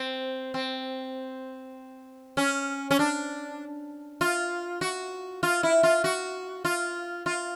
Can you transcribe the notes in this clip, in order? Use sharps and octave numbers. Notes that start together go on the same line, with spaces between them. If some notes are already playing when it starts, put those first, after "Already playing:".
Already playing: C4
C4
C#4
C#4
D4
F4
F#4
F4
E4
F4
F#4
F4
F4